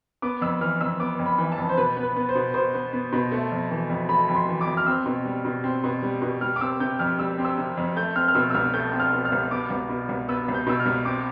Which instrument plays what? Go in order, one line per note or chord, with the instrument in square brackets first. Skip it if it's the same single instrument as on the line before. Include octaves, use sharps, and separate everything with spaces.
[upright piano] B3 D6
F2 E6
E3 F6
F2 E6
B3 D6
F2
B5
E3
A5
F2
C5
B2 B4
B3
B4
B3
C5
B2
B2 C5
B3
B3
B2
A3
F2
E3
F2
A3 B5
F2 B5
C6
E3
D6
F2
F6
C4 E6
B2
G3
B2
C4
B2
G3
B2
G3 F6
D6
C4 E6
C3 G6
F2 F6
G3 E6
C4
E6
C3
F2
A3 G6
C4 F6
F6
B2 E6
E6
C2 F6
A3 G6
C4
F6
B2
F6
C2
B3 D6
C2
B2
C2
B3 E6
C2
G6
B2 E6
F6
C2
C4 D6